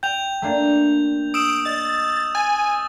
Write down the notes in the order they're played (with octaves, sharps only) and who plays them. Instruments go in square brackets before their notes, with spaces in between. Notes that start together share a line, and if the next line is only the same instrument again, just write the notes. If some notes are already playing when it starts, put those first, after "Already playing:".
[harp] G5 [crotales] G6 F7
[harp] A3 A#3 D4
[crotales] D#6 E6 E7 [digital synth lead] D7
[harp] D#5 [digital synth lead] A6
[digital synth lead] G#5 [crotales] A6